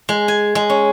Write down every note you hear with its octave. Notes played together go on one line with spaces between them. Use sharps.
G#3
G#5
G#3
C#4